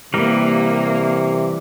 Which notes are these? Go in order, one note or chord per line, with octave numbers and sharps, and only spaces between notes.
C3 E3 G3 A#3 A#4